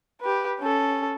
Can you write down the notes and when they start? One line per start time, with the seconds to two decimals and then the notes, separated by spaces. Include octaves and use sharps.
0.21 G4 B4
0.60 C#4 A4